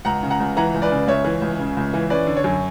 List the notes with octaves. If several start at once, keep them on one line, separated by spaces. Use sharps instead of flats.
C#2 F#5 A#5
C#3
F#5 A#5
C#2
E3 F#5 A#5
C#2
B4 D5
C#3
C#2 C#5 E5
E3
C#2
C#3
C#2
E3
C#4 B4 D5
D3
C#5
F#2